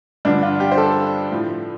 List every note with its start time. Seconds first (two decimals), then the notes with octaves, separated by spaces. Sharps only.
0.25 G2 D3 F3 D4
0.43 F4
0.60 G4
0.72 C5
0.78 A4
1.31 A2 F3